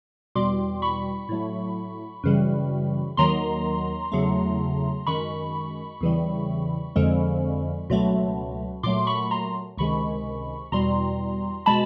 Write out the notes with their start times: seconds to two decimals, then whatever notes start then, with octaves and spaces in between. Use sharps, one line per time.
0.35 E2 B2 G3 C6 D6
0.82 B5 C#6
1.29 A2 F#3 A3
2.24 F#2 C#3 E3 G3
3.17 D#2 D#3 F#3 A#5 C6
4.12 E2 C#3 F#3 A3
5.07 F#2 D#3 G#3 B5 C#6
6.01 E2 C#3 E3 G3
6.96 F2 D3 F3 G#3
7.90 C#2 B2 F#3 A3
8.83 A#2 F#3 A3 C6 D6
9.07 B5 C#6
9.31 A#5 C6
9.78 C#2 C3 D#3 G#3 B5 C#6
10.72 E2 B2 G3 A#5 C6
11.66 B2 G#3 A5 B5